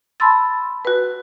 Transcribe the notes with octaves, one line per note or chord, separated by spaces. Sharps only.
A5 B5 C6 E6 A6
F#4 B4